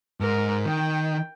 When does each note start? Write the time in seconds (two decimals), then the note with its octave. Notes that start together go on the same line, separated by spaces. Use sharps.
0.21 G#2 A#4
0.66 D#3 G5